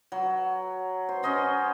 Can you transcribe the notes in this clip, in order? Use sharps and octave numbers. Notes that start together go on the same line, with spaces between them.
F#3
C5
C#4 C5 D#5 C6